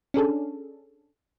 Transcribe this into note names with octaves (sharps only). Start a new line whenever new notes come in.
C#4 D4 G#4 A4